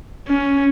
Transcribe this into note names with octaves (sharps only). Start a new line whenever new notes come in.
C#4